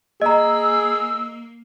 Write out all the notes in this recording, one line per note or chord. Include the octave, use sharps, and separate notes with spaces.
A#3 G#4 D#5 A#5 E6